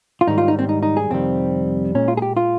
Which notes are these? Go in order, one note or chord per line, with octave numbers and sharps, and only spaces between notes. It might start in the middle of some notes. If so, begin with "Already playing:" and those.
F4
G#2 D#3 G3 D#4
F4
D#4
C4
D#4
D#4
G#4
F2 C3 D#3 G3 C4
A#2 G#3 C#4
F4
G#4
G4
F4